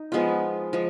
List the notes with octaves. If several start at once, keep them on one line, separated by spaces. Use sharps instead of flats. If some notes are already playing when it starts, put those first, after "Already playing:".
Already playing: D#4
F3 G#3 B3 F4
F3 G#3